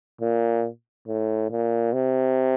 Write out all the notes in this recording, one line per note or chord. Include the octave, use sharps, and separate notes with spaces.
A#2
A2
A#2
C3